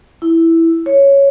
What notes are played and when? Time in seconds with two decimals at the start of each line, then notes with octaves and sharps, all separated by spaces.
0.22 E4
0.86 C#5